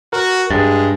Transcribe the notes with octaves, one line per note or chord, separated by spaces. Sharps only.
F#4 A#4
G2 G#3 G#4 A6